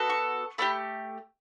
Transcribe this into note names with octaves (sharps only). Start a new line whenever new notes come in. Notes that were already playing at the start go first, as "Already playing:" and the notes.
Already playing: B3 F#4 A4
C#6
A3 D4 G4 B5